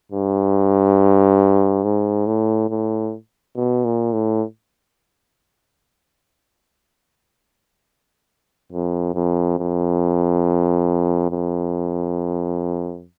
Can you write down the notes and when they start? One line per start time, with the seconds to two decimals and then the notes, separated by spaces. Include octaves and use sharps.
0.12 G2
1.84 G#2
2.27 A2
2.70 A2
3.56 B2
3.85 A#2
4.13 A2
8.72 F2
9.15 F2
9.59 F2
11.31 F2